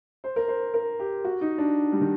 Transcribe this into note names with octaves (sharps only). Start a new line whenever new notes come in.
C5
A#4
C5
A#4
G4
F#4
D#4
D4
G3
D#3